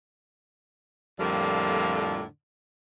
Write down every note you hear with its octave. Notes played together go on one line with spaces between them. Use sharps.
F2 A2 D3 F3 G3 A#3